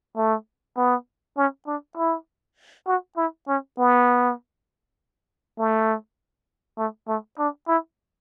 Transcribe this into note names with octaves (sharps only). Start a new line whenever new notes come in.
A3
B3
C#4
D4
E4
F#4
E4
C#4
B3
A3
A3
A3
D4
E4